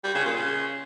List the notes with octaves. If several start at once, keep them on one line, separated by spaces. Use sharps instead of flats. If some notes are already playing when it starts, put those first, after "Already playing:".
G3
C#3
A#2
C#3